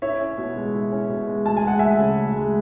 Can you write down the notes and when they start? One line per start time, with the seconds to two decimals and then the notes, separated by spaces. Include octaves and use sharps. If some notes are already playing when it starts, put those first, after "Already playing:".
0.02 E4 C#5 E5
0.20 C#4
0.38 B2
0.56 G#3
0.74 E4
0.92 C#4
1.10 B2
1.27 G#3
1.45 D2 A5
1.57 G#5
1.63 G#3 F#5
1.79 D2 E5 G#5
1.99 C#3
2.17 D2
2.35 G#3